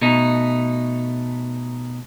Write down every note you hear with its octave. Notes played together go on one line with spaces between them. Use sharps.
B2 A3 D#4